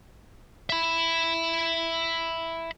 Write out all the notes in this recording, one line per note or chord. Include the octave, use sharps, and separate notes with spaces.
E5 B5